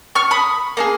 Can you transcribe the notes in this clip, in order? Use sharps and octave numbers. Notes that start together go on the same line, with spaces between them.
C#6 F6
B5 D#6
A#3 D#4 G#4